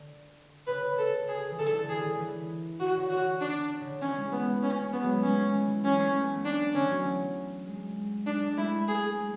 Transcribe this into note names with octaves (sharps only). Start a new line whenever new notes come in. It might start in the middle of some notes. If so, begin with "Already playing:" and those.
Already playing: D3
C#3 B4
C#3 A4
G#4
E3
D3 A4
E3
D3 G#4
D3
E3
D3 F#4
C#3
D3 F#4
D4
C#3
D3
E3 C#4
G#3
A3 B3
C#4
G#3 B3
F#3
G#3
C#4
E3
E3
F#3 C#4
A3
A3
B3
A3
D4
D3 C#4
E3
F#3
G#3
G#3 D4
G#3
A3 E4
G#4
G#3